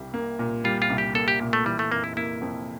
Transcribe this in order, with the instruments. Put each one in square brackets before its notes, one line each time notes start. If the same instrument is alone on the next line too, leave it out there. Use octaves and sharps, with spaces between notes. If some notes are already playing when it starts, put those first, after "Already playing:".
Already playing: [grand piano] C2 G3
A#3
A#2
[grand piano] G3 [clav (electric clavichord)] F4
[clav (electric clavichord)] F4
[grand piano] C2
[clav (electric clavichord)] G4
[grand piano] A#3 [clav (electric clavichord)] A4
[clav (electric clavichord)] G4
[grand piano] A#2
[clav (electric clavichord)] A3
[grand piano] E3 [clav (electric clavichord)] G3
[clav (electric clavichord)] A3
[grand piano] F1 [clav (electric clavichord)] A#3
[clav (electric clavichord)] E4
[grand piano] A#3 [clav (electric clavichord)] E4
[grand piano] F2